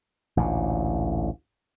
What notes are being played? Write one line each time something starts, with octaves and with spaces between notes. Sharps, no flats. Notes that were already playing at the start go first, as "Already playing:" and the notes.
A1 D2 A#2